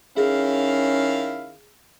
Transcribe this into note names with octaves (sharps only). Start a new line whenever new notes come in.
D#3 C#4 E4 G#4 F5